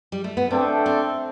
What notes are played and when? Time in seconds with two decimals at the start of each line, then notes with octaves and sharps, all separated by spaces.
0.12 G3
0.24 A3
0.37 B3
0.50 A3 C4 D4 A4 E5 G5
0.86 C4